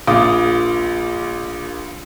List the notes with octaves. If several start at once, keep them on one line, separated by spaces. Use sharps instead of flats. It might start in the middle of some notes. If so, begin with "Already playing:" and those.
A#1 F4 D6 D#6